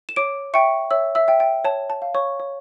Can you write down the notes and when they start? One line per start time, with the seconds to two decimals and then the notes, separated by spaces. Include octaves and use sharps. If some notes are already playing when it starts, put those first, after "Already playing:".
0.09 E7
0.16 C#5 D6 D7
0.54 E5 G5 C#6 C#7
0.91 C#5 E5 E6
1.15 E5 E6
1.28 E5 G5
1.40 G5
1.65 C#5 A5
1.90 A5
2.02 F5
2.15 C#5 C#6
2.40 C#5